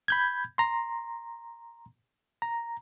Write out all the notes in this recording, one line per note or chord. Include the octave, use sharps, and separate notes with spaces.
B5 G6 G#6
A#5 C6
A#5